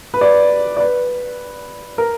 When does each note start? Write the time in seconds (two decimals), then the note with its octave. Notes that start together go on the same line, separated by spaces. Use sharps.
0.14 B4
0.21 D5
0.77 D5
0.80 B4
1.98 A#4